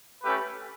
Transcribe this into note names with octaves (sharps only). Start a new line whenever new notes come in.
A3 C#4 G4 B4